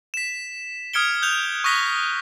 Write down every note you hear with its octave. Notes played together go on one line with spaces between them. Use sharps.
B6 E7
D#6 F6 G#6 C#7 D7 G7
F#6 G6 F7 G7
C#6 D#6 F#6 A#6 B6 G7